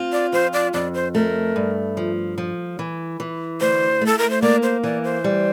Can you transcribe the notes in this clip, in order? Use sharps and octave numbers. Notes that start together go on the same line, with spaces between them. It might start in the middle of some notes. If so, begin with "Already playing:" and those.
Already playing: C4 F4
D5
F2 C5
D5
F2 D5
C5
A3 A#4
G2
F3
F3
E3
E3
D2 C5
A3 A4
A#4
C5
A#3 D5
C5
E3 D5
C5
G3